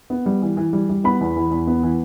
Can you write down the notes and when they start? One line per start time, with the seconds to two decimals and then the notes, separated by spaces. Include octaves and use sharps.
0.10 B3
0.26 G3
0.42 E3
0.57 E3
0.73 G3
0.89 G3
1.04 B3 B5
1.21 E2
1.36 E3
1.51 E2
1.67 B3
1.83 E3